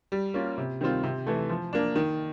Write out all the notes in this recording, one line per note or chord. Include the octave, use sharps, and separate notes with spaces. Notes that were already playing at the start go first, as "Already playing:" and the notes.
G3
A#3 C#4 F4
C3
D#3 G3 C4 F4
C3
E3 A3
F3
A#3 D4
D#3